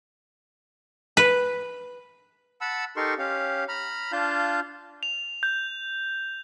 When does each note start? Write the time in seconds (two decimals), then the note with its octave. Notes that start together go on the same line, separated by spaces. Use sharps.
1.17 B4
2.61 F#5 A5 B5 E6
2.96 D#4 G4 A4 A#4 C6 C#6
3.18 C#4 G4 F5
3.69 A#5 B5 F6
4.12 D4 F4 F5 A5 G6
5.03 F7
5.43 G6